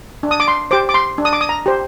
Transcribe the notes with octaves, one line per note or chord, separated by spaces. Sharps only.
D4
D#6
D6
C6
G4 C5 D6
D6
C6
D4
D#6
D6
D#6
A#5
G4 C5